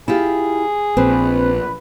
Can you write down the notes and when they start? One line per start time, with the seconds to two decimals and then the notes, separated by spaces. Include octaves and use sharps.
0.08 E4 F4 G4 G#4
0.97 A#1 C4 B4